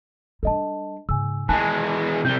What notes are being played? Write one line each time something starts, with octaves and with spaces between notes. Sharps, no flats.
G3 D4 A4 D#5 A5
G#2 C#3 G#5 E6
D#3 E3 G#3 G#5 A5 F#6
C3 G3 G6 G7